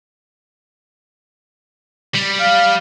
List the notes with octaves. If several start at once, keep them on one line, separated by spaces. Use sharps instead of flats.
G3
F5